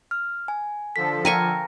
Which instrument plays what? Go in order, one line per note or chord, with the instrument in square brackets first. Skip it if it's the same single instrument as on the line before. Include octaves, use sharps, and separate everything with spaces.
[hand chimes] F6
G#5
[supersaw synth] D3 F3 A4 [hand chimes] B6
[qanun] A#4 G#5 C#6 [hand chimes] G5